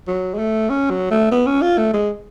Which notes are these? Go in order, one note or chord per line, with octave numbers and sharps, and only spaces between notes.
F#3
G#3
A3
C#4
F#3
A3
B3
C#4
F4
A3
G#3